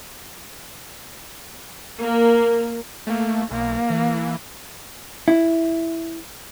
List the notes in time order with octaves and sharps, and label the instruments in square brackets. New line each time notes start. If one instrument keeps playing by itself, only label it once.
[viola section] A#3
[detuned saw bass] A3 [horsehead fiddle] A#3
[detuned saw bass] B1 [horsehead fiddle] A#3
[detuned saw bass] E3
[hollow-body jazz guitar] E4